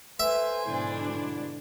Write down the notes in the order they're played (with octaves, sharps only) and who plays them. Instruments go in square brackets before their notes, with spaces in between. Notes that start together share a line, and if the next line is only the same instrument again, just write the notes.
[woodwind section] A4 B4 [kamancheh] C5 G#5 [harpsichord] E5
[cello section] G#2 B2 D4 [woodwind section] D3 F3 E4